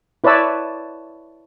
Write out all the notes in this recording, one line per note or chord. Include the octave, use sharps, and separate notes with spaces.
E4 B4 C#5 D5 A5 E6